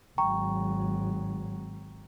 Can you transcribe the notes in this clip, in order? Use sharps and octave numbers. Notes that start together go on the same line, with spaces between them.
G#1 F#3 G5 A#5 C#6